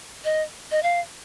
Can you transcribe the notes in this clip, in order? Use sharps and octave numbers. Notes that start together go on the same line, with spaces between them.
D#5
D#5
F5